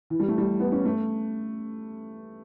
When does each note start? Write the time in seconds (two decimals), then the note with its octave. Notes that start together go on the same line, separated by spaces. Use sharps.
0.10 E3
0.20 G3
0.28 A3
0.38 G3
0.60 B3
0.72 C#4
0.85 A3